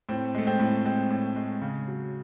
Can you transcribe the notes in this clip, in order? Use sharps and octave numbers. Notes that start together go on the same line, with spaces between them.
A2 C4
G#3 A3
C4
A2
G#3 C4
A2
G#3
C#3
F#3